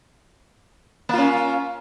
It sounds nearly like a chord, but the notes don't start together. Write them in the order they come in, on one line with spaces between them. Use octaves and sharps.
A#3 F4 C#4